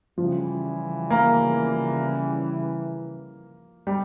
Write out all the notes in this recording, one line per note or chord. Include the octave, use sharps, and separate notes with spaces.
C#3 E3 F3 G3
A#3
G3